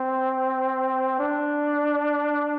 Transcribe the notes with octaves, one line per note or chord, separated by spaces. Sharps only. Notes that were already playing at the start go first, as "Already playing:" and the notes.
Already playing: C4
D4